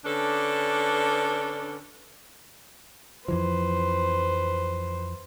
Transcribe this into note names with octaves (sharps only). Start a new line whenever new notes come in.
D3 C#4 D4 A4 B4
F2 E3 F3 B4 C5